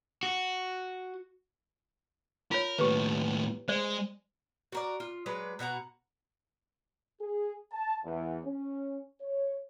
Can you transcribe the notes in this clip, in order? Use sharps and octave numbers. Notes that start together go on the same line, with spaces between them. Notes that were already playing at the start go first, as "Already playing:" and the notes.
F#4
F4 A#4 C#5
D#2 A2 G4 B4
G#3 C5 D5
F#4 A#4 D5
F4
F#3 G#3 B4 D5
B2 F#4 F#5 A#5
G#4
A5
E2
C#4
C#5